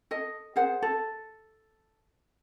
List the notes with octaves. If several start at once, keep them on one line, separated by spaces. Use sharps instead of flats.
A4 D#5
G#4 A#4 C5 F#5
A4